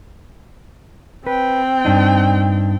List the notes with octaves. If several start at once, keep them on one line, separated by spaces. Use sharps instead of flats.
C4 B4 G5
G2 D4 D#4